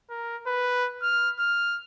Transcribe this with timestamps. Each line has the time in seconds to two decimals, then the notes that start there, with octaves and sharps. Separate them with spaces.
0.10 A#4
0.47 B4
1.02 F6
1.39 F6